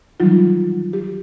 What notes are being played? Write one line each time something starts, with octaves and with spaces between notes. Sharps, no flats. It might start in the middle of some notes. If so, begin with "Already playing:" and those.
D#3 E3 F#3 G3 D#4 F4
G4